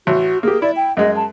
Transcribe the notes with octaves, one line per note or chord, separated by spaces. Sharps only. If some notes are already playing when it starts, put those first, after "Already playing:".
A1 F#4
A#3 G4 G#4
E4 D5
G5
F#2 G#3 D#5
A5